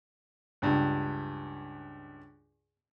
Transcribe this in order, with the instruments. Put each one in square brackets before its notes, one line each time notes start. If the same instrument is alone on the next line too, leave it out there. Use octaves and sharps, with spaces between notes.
[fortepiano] C#2 G2